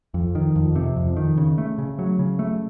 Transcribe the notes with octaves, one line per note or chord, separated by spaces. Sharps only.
F2
D#3
F2
C3
F2
D#3
C#3
A3
C#3
F#3
C#3
A3